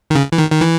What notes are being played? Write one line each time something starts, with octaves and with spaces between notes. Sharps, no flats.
D#3
C#3
E3
D#3
D#3
E3